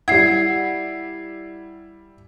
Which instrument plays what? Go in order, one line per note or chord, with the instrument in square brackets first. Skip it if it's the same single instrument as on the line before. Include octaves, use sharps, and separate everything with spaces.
[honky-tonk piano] G3 E4 [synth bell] F#5 [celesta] G#6 C7